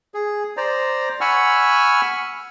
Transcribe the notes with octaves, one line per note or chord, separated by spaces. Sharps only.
G#4
C5 D5 A#5
F#5 G#5 B5 C#6 E6 F6